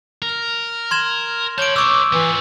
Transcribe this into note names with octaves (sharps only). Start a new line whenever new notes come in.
A#4
C6 G#6 E7
C#5 A5 C6 G6 D7
B4 C#5 C#6 D6 E6
E3 B3 F4